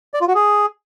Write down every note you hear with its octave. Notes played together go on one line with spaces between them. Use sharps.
D5
F4
F#4
G#4